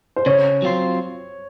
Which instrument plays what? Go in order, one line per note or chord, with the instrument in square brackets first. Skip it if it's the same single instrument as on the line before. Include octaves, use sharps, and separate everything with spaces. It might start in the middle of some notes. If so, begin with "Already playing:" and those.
[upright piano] C5
[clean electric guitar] C#3 [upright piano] C#5
[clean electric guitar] F#3 C4 F4 C5